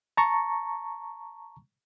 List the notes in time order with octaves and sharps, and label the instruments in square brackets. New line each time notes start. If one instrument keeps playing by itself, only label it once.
[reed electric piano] A5 A#5 C#6